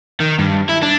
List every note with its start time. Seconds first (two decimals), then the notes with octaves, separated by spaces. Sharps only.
0.20 D#3
0.39 G2
0.69 E4
0.82 D4